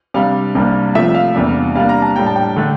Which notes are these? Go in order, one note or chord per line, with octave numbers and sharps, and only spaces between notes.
C3 G3 D4 F5
C2 C3 G3 A#3 D4
C3 F3 A3 E5
F5
E2 C3 G3 A#3 D4
C3 G3 A#3 D4 F5
A#5
A5
A2 G3 D4 G5
A5
G5
D3 A3 D4